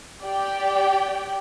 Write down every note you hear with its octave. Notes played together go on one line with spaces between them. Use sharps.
G4 D5 G5